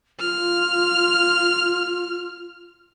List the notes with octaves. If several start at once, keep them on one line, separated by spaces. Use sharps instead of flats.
F4 F6